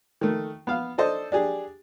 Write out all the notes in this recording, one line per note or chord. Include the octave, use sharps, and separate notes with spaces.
D#3 A3
B3 F5
D4 A4 C5 D#5
D4 G4 G#4